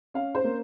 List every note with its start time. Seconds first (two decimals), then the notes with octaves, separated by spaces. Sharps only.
0.14 C#4 F5
0.35 C5
0.44 A#3